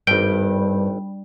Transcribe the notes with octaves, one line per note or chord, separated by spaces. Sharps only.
G#1 G2 G5